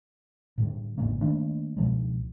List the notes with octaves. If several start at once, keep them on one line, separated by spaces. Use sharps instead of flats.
A2 D3 G3
G#1 A2 C#3 A#3
D#3 A3 A#3 D4
C#2 B2 F3 G#3